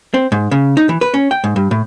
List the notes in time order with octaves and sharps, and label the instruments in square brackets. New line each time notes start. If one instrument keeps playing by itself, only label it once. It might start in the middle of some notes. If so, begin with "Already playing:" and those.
[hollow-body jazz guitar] C4
G#2
C#3
D#4
E3
B4
C#4
G5
G#2
G2
A2